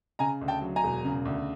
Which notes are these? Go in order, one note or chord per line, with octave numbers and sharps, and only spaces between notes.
C#3 G#5 A#5
D2
G5 A5
F#3
G#5 A#5
E1
C#3
D2